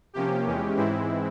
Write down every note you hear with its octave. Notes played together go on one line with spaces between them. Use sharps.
C3 F3 A#3 C#4 G4
E2 E3 G#3 C#4
G#2 E3 G#3 C4 E4